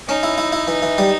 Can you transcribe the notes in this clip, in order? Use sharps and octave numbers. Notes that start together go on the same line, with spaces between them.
C#4 D#4
E4
E4
E4
E3
E3
G3